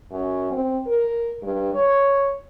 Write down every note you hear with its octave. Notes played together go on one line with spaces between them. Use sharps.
F#2
C4
A#4
G2
C#5